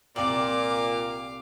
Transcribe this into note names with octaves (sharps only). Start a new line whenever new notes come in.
C2 A#2 D5 F5 G5 D6 F#7